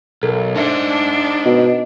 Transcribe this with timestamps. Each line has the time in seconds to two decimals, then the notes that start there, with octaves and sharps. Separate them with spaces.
0.23 B1 A4 A#4
0.56 D4 D#4 C5 D5 E5 A5
1.45 B2 D#5